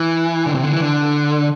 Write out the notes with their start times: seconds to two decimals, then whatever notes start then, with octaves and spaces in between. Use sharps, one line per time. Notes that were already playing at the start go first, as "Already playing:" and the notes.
Already playing: E3
0.46 D3
0.55 C3
0.63 D3
0.71 E3
0.80 D3